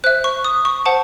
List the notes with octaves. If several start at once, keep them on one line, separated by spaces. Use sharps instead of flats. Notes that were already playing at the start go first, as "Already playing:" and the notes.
C5 E5 F#6
C#6
D#6
C#6
C5 F#5 A5